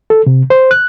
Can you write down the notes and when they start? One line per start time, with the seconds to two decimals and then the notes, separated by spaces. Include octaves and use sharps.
0.10 A4
0.26 C3
0.50 C5
0.71 F#6